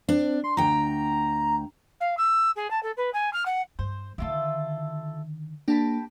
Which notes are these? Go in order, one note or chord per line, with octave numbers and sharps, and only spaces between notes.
C4 D4
C6
D2 G5 A#5
F5
E6
G#4
A5
A4
B4
G#5
F6
F#5
G2 C5
D3 D#3 E4 F4 A4
A#3 D4 G4 A5 B5